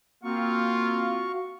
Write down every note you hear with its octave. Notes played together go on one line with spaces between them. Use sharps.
A#3 C4 F4 F#4 F5 C#6